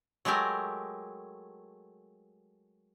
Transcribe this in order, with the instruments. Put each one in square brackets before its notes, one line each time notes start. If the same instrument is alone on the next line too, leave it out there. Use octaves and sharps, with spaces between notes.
[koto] F#3 G#3 A3 G4 A#4